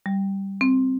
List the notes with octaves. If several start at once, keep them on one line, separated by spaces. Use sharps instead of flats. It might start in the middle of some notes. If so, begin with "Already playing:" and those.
G3
C4